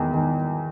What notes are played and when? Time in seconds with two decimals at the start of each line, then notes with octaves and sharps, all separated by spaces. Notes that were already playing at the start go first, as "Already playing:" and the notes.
Already playing: E2 D#3
0.14 D#3